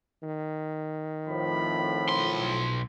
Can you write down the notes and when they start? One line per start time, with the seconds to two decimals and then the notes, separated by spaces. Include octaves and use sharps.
0.23 D#3
1.27 F2 A2 F3 B5
2.09 B1 C6